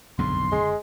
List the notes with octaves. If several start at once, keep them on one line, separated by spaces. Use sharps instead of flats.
F#1 B1 F2 G#2 D3 C6
G#3